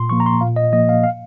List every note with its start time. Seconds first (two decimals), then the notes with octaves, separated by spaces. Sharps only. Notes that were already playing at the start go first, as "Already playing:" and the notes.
Already playing: A#2 C6
0.10 F3 A#3 C#6
0.20 A#5
0.26 C6
0.41 A#2 F5
0.56 D#5
0.72 F3 A#3 D#5
0.89 F5
1.04 F5